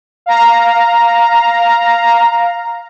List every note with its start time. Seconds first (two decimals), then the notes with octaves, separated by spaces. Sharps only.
0.26 F5 A#5